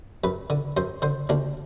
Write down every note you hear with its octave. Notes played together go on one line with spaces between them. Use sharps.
F#2 B4
D3
F#2 C5
D3 C5
D2 D4